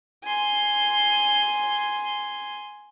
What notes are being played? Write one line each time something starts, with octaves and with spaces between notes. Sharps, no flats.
G#5 C6